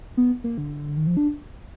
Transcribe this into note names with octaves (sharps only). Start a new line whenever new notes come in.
B3
A#3
D3
D#3
F3
D4